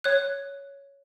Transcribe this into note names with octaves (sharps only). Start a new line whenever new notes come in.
C#5 F#6